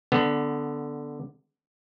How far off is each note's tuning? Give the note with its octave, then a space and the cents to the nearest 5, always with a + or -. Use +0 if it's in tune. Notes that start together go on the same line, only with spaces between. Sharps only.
D3 +0 B3 +0